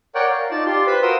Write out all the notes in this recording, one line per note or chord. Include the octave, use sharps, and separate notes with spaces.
A#4 C#5 D5 F#5 G5
F5
D#4 F4 D5 A5
F4 G4 C6
B4 C5 B5
F#4 A#4 F5 C6 D#6 E6